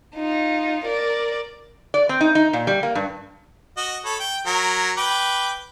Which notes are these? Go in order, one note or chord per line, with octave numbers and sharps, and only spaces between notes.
D#4 F4
A#4 D5
D5
C4
D#4
D#4
A#2
G3
A#3
G2
F#4 D#5
A4 C#5 B5
G5
F#3 A#4
B4 G5 D6